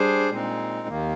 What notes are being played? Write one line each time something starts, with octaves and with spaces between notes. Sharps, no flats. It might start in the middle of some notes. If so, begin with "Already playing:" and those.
Already playing: G3 D4 G#4 C5
A#2 G#3 C4 D#4
D#2 D#3 A#3